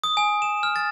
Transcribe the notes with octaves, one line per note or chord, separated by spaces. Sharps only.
D#6
G#5
E7
F6
A6